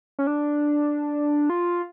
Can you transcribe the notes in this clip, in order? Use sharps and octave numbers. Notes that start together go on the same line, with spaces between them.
C#4
D4
F4